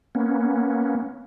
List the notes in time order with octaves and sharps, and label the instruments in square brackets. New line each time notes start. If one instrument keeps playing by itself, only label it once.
[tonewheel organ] A#3 B3 C#4